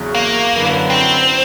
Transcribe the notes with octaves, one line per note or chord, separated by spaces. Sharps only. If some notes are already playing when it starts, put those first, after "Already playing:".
Already playing: E2 C#3 F#3
A#3
F#2 D3 F#3 B3 E4
C4